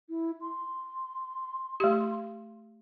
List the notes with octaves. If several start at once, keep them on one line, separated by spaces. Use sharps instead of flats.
E4
C6
A3 G4